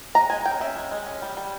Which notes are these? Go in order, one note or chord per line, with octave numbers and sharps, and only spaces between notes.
G#3 A#5
G#3 G#5
C#4 G5
C#4 E5
G#3
G#3
C#4
G3
G3